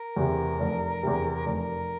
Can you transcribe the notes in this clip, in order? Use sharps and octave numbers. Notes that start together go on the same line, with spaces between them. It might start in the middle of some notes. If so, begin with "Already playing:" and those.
Already playing: A#4
E2 C3
F1
E2 C3
F1 A#4